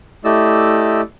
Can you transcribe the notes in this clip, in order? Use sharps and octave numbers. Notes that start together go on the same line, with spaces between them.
A3 E4 G4 D5 D#5 E6